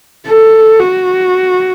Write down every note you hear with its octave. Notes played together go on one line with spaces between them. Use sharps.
A4
F#4